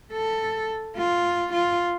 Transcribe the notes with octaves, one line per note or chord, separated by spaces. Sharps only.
A4
F4
F4